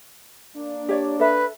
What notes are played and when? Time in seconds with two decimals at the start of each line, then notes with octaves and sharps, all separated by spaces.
0.56 A#3 D4
0.89 G4 C#5 D5
1.20 A4 B4 E5